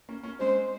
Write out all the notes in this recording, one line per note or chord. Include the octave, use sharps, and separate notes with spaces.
A#3 C#4
A#3 C#4
G#3 C4 C5